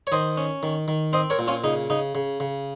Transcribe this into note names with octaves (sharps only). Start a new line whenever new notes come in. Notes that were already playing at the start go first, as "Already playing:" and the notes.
C#5
D#3 C5 D#5
C#4
D#3
D#3
C4 C5 D#5
A#4 C#5
A#2
C#4 F4
C#3 D#4
C#3 D#4
C#3
C#3